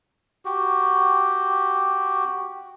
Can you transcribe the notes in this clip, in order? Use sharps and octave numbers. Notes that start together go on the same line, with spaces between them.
F#4 G4